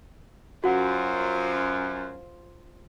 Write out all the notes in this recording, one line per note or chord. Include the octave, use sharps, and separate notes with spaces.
F#2 F4 F#4 C5 F#5